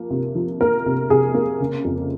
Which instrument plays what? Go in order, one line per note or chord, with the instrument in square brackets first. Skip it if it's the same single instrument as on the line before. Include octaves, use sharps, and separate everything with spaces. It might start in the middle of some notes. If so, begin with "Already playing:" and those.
Already playing: [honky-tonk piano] F3 A#3
C3
F3
A#3 A#4
C3
C3 G#4
A#3
C#3
F2